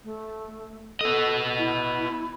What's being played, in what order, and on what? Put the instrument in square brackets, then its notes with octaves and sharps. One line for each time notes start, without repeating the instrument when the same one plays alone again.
[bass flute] A3
[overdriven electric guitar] B3 D#5 [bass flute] A4
[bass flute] E4